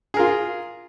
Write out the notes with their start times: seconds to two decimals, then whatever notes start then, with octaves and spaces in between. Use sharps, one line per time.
0.14 G#4
0.17 A#4
0.20 F4